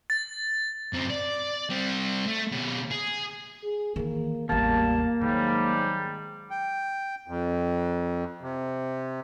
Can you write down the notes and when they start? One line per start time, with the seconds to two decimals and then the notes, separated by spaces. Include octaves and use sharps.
0.10 A6
0.93 F#2 C4
1.10 D5
1.70 G3 C4
2.27 A3
2.52 B2 C#4
2.92 G#4
3.64 G#4
3.96 D#3 E3 A#3
4.49 A1 E2 G3 A#3 A5
5.21 G#2 D#3 F#3 G3
6.51 G5
7.28 F2
8.41 C3